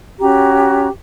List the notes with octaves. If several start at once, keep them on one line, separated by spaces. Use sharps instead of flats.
C#4 F#4 G4 A#5